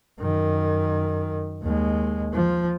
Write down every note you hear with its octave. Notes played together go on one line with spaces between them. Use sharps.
F#2 D#3
D#2 G#3
F3